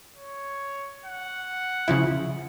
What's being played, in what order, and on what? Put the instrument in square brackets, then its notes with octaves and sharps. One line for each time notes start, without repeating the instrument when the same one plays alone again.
[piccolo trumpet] C#5
F#5
[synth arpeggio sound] C#3 F3 E4